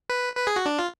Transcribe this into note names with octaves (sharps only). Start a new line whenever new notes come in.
B4
B4
G#4
F#4
D4
F4